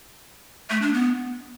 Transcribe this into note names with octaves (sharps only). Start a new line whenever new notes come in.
A3
D4
B3